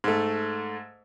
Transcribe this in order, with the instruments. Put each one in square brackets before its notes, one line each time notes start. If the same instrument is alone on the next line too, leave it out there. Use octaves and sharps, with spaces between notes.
[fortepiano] G#2 A3